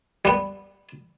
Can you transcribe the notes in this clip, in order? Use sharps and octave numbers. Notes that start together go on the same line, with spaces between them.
G3 B3